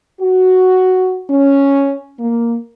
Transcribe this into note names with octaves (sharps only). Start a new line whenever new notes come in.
F#4
C#4
A#3